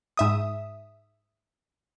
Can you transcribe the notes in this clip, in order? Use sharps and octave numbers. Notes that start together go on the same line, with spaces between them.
G#2 E5 D#6